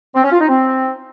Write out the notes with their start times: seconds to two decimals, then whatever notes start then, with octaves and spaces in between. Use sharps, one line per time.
0.15 C4
0.23 C#4
0.32 F4
0.40 D#4
0.48 C4